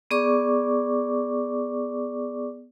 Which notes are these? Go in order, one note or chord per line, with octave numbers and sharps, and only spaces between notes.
B3 G#4 D5 C#6 D6